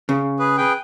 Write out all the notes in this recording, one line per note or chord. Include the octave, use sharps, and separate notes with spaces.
C#3
G#4 B4
G#4 B4 G5